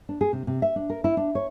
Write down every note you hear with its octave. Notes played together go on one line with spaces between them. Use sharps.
D4
G#4
C3
C3
E5
D4
A#4
E4
D4
C#5